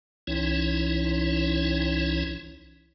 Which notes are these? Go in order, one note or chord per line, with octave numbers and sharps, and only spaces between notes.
C2 E3 C#4 D#4 E4 C#5